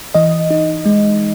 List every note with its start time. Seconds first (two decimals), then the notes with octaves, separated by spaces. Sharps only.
0.15 E3 D#5
0.51 D#4
0.86 G#3